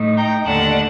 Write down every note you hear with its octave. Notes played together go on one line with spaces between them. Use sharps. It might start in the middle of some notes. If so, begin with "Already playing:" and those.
Already playing: A2 A3 D#4
G5 A#5
D#2 D3 A3 D4 F#5 A5